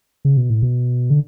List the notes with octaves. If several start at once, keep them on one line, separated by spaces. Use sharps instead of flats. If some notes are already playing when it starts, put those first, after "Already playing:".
C#3
B2
A2
B2
D3